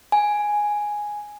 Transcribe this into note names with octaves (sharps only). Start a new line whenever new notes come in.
G#5